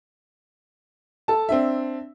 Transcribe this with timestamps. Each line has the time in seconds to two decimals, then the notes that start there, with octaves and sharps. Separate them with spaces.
1.28 A4 A5
1.49 C4 D4 E5